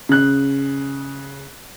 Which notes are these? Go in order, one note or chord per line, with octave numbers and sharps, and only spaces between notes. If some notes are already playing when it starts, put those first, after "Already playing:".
C#3 F#6